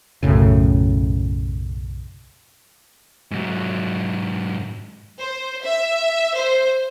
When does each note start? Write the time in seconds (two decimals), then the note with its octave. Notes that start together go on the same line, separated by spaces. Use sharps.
0.23 B1 F#2 A2 C#3
3.31 G#2 F#3
5.20 C5
5.63 E5
6.36 C5